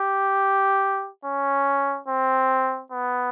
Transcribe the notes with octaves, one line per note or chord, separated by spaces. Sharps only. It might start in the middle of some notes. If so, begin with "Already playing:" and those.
Already playing: G4
C#4
C4
B3